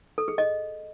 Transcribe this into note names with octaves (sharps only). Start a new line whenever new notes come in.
A4
G#4
D#5